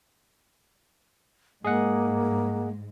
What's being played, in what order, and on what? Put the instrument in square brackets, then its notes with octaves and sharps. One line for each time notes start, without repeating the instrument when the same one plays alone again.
[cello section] G#2 G#3 [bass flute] A#3 [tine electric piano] G#4 D#5 F#5